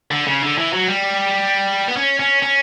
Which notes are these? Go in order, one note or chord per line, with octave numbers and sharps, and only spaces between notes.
D3
C#3
D3
E3
F#3
G3
B3
C#4
C#4
C#4